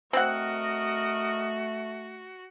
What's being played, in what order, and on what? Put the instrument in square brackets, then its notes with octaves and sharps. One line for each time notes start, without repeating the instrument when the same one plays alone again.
[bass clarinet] A3 [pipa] C4 F#5 [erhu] F#4 [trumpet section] A#4 D#5